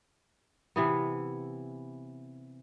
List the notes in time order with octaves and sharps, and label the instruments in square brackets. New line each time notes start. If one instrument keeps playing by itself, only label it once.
[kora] C3 E3 B3